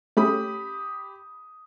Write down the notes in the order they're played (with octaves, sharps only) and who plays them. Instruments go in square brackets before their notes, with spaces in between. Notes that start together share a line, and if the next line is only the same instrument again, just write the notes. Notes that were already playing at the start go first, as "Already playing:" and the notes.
[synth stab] A3 C#4 [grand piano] G4 B5 D#6